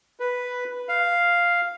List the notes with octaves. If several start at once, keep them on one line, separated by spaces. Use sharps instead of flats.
B4
F5